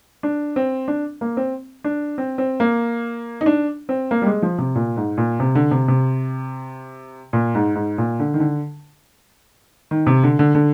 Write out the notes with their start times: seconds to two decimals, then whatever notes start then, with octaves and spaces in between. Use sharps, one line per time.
0.23 D4
0.56 C4
0.88 D4
1.21 A#3
1.37 C4
1.84 D4
2.18 C4
2.38 C4
2.60 A#3
3.41 D#4
3.46 D4
3.89 C4
4.11 A#3
4.22 G3
4.26 G#3
4.42 F3
4.58 C3
4.75 A#2
4.97 G#2
5.17 A#2
5.40 C3
5.55 D3
5.71 C3
5.88 C3
7.33 A#2
7.55 G#2
7.75 G#2
7.98 A#2
8.20 D3
8.34 D#3
8.40 D3
9.91 D#3
10.07 C3
10.23 D3
10.39 D3
10.55 D3